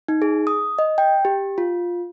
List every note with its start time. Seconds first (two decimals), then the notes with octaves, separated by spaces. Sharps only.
0.08 D#4
0.22 G#4
0.47 D#6
0.79 D#5
0.98 G5
1.25 G4
1.58 F4